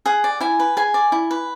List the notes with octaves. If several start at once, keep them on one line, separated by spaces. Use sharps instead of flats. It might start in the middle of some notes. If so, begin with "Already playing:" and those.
G#4 F#5
D5
E4 G#5
B4
G#4 G#5
D5
E4
B4